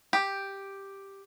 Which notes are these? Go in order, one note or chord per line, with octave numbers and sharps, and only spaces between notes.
G4